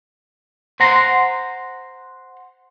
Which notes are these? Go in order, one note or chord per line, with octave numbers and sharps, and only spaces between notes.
C5 F#5 A#5 C6